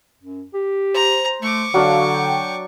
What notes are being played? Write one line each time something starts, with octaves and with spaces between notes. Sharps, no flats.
F#2
G4
C5 A#5
A3 C#6 D6
D3 F#3 D4 F5
G5